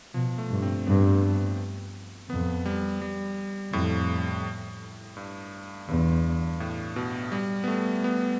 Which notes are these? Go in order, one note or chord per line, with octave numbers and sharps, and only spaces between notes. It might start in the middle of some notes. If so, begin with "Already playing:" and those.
B2 F3
A3
G2
C4
G2 B3
F2 B3
G3
G3
F2 A2
G2
E2 G2
A2
B2
G3
B3
A3
B3